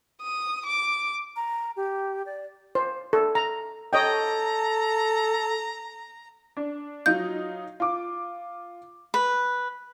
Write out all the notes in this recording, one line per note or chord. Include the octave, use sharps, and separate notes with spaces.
D#6
D6
A#5
G4
D5
C5
A4
A#5
A4 C#5 D#5 G5 A#5
D4
F#3 D#4 F4 G6
F4 D6
B4